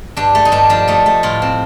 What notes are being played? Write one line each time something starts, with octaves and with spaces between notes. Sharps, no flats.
G2 D4
A3
D#4
G2 D4
F3 D4
A3 D#4
A3
A2 F4
C4